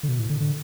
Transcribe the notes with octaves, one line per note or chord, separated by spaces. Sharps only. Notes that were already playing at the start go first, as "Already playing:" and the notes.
D3
B2
A2
D3
D3